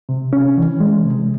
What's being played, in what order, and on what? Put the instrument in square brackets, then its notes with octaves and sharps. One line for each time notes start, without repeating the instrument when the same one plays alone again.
[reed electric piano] C3
C#4
E3
G#3
C3